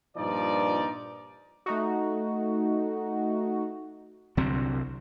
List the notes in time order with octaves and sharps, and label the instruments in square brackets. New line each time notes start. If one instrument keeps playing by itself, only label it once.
[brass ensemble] G2 A#2 F3 D#4 D5
[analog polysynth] A3 D#4 F#4
[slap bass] C2 D3 F#3 C4